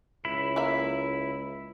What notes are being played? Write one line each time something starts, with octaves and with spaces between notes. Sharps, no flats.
C#2 E4 B5
A#3 A#4 E5